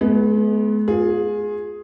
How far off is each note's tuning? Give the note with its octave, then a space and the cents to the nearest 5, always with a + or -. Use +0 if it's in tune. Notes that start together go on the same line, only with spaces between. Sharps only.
G#3 +40 B3 +0
F4 +30 G#4 +0